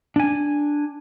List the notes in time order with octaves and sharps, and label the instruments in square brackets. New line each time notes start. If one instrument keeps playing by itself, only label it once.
[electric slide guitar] D4 G#5